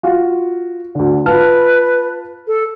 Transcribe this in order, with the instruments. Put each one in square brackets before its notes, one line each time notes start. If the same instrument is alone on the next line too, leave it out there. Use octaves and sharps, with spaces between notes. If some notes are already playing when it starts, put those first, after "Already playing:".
[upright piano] F4 F#4
D2 D3
[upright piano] F4 A5 F6 [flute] B4
[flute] A4